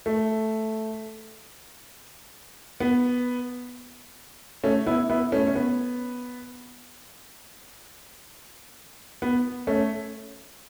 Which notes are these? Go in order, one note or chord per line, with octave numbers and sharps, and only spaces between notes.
A3
B3
A3 C#4
B3 E4
B3 E4
A3 C#4
C#4
B3
B3
A3 C#4